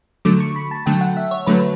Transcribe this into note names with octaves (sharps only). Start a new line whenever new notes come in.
D3 F#3 A3 D6
C#6
B5
A5
D3 F#3 A3 G5
F#5
E5
C#5
D3 F#3 A3 B4